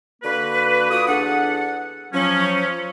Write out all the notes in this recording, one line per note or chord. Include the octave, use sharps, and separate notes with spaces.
D3 A#3 F#4 B4
F4 F#4 B4 D6 D#6
E2 D4 A4 F#5
F3 F#3 C#4